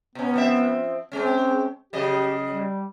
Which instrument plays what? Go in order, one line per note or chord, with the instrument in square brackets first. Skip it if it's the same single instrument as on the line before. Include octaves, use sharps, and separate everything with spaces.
[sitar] B2 C#4 [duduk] B3
[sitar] F3 C4 E5
[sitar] G#3 C#4 [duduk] C4
[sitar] C#3 F#3 D#5 [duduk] G4
[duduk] G3